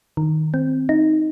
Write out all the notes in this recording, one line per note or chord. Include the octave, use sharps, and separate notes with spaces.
D#3
C4
D#4